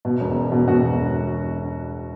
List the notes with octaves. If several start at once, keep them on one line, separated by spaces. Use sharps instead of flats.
B2
E1
E1
B2
B2 F#4
E1